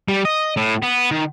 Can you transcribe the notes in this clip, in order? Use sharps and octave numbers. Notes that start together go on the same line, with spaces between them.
G3
D#5
A2
B3
D#3